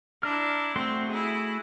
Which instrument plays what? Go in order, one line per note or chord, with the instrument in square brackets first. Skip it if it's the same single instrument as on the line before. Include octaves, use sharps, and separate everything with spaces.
[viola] D4 E4 [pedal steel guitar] A#5 F6
[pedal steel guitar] A3 F#4 C6 [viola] C4
[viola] E4 G#4